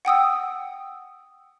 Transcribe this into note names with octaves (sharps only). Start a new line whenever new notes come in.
F#5 G5 D#6 E6